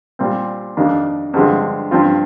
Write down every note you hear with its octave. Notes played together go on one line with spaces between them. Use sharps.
A#2 G3 C4
F2 D#3 A#3 D4
G2 D3 F3 G#3 C4
G2 F3 C4 F4